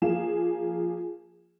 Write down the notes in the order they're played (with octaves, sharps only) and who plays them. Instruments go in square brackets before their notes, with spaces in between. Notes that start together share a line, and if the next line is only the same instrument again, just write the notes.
[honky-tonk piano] F3 A#3 G#4 F5 E7